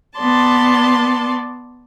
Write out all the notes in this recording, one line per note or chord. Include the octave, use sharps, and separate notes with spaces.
B3 D5 A5 C6